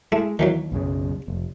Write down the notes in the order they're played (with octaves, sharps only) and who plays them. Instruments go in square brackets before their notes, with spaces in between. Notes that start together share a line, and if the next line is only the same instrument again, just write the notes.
[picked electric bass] G#3 [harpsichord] A3 E4
[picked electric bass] D#2 [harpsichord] D#3 E3 F#3
[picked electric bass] B1 F#2 C#3
F1